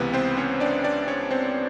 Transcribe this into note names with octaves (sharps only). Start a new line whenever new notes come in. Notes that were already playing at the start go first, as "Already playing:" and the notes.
Already playing: C#2 C3 E3 B3 B4
C4 C5
C#4 C#5
D4 D5
D4 D5
C#4 C#5
C4 C5